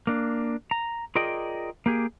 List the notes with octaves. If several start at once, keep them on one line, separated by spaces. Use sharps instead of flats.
A#3 D4
A#5
F4 G#4 A#4 D5 D#5 G5
A#3 G4 G#4